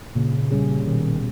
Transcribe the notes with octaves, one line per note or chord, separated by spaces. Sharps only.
A#2 C#3
G3 C#4 G#4
B2 D#3